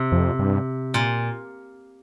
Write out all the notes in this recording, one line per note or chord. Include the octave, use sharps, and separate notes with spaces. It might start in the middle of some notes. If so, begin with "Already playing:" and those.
Already playing: C3
F2
G2
A#2